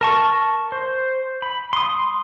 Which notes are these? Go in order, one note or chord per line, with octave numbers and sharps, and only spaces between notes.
A#4 A5 C#6
C5
B5
C6 D#6